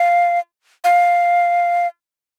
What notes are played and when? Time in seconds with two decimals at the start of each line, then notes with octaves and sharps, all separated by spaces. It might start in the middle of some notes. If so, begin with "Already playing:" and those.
Already playing: F5
0.84 F5